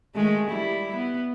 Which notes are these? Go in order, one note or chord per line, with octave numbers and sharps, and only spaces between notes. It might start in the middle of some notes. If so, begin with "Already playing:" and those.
D#3 G#3 A3
G3 E4
B3